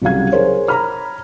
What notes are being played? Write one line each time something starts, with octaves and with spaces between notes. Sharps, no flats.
C2 C#3 F#3 F5 G#6
G#4 A#4 C5 C#5
A#5 B5 F6